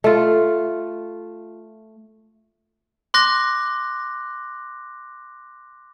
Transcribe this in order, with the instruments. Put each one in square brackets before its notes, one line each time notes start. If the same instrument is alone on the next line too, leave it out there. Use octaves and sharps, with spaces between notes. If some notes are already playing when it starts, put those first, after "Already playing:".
[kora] A3 F4
[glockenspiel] C6 D6 F#6 A#6